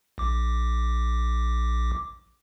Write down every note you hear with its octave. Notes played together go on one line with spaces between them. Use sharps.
A#1 D6